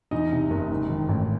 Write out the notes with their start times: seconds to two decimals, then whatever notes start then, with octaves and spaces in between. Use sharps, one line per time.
0.11 E2 D#4 D#5
0.32 C3
0.50 F#1
0.70 G#2
0.89 D#3
1.09 A1